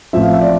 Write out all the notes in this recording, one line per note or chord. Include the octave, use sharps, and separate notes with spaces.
A1 A2 F3 C4 E5
F5
E5
D5